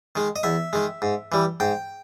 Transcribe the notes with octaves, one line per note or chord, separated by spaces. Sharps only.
D#3 G#3
D#5
E2 E5
D#3 G#3
G#2
E3 G3
G#2 G5